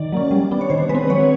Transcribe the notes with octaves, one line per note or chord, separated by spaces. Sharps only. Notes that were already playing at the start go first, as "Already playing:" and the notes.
Already playing: D#3 D5
F#3 A#3 C#4
G3
B3 D4
C#5
D#3 C5
G#3 B4
C4
F#3 C#5